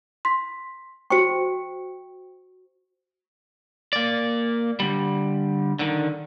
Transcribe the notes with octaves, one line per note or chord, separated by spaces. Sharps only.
C6 B6
F#4 C5 G5 C#6 C#7
A#3 D5
D3 G3
D3 D#3